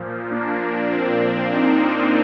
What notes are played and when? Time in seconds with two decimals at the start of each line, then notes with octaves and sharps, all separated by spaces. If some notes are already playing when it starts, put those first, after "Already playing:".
Already playing: A#2 F3
0.30 A#3 D4
0.61 A#3
0.91 C4
1.21 A#3 D4
1.53 C4 D#4